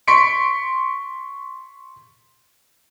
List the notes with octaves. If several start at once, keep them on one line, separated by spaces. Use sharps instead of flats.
C6 C#6 B6 C#7 D7